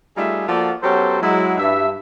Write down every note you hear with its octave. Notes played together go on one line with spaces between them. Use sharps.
G3 A3 D#4 F4 G#4 E5
F3 A#3 F4 F#4 A4 D5
F#3 B3 C#4 G4 A4 C5
F#3 G#3 E4
G2 E5